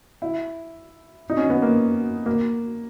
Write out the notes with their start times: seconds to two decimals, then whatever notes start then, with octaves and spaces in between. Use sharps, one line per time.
0.22 E4
1.30 D#4
1.37 C#4
1.50 B3
1.62 A#3
2.26 A#3